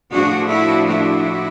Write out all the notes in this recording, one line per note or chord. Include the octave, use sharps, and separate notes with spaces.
A2 F3 A3 D4 F#4 G#4
E4 F#4
E4 F#4